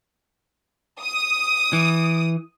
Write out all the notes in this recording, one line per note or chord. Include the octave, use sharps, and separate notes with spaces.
D#6
E3